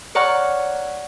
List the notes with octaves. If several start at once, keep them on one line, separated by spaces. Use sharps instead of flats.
C#5 D5 F#5 A#5 C#6 F6